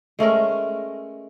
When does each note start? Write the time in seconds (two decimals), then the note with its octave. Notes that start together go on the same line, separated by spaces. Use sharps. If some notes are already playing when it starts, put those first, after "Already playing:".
0.19 G#3 A3 C#4 A#4